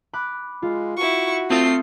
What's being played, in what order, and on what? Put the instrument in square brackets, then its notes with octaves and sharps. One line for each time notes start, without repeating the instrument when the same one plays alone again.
[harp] B5 D6 F#6
[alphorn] G#3 [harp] F4
[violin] E4 C#6 [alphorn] F#4
[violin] A3 C7 [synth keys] C4 F4 [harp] D#6